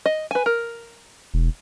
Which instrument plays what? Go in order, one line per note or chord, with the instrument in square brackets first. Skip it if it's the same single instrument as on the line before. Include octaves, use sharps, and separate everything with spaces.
[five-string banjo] D#5
B4 G#5
A#4
[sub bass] E1